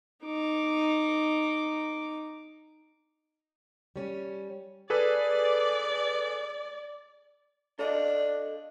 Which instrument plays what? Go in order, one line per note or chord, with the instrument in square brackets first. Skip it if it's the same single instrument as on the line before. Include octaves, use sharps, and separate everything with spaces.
[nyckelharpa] D#4 D6
[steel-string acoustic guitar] G3 C#4
[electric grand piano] G#4 A4 B4 [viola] D5
[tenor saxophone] D4 [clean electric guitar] A4 D#5 F5